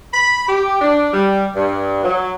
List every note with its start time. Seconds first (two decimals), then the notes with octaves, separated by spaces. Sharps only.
0.13 B5
0.47 G4
0.82 D4
1.13 G3
1.56 G2
2.03 F#3